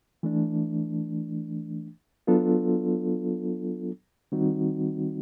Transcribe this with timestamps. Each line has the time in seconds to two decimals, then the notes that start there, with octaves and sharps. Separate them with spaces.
0.23 E3 A3 D4
2.27 F#3 B3 D4 F4 A4
4.32 D#3 G3 C4 D#4 F#4